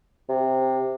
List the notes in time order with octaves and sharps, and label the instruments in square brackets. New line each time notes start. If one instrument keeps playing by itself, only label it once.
[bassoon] C3